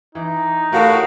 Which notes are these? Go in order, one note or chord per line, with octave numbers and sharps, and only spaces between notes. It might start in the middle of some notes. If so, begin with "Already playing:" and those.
E3 D#4
A2 F#4 G4 A#4 C#5 F5